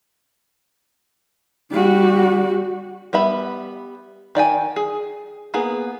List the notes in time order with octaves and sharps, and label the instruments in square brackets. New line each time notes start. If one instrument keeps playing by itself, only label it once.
[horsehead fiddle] G3 F#4
[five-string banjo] G3 B3 E5 B5
D#3 D5 G5 G#5
G#4
A#3 B3 G#4